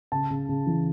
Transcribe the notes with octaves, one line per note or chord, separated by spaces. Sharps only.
C#3 A5
C#3
C#3
E3